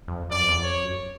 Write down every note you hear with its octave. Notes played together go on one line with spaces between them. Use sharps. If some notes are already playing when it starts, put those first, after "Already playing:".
F2
F#2 D5
F2
E2
F2
C#5
F#2